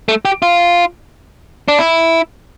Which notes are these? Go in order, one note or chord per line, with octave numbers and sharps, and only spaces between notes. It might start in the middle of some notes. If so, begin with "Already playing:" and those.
A3
G4
F4
D4
E4